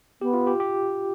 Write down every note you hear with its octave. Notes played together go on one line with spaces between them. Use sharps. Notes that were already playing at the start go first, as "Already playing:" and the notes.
B3 G4
F4
G4
G4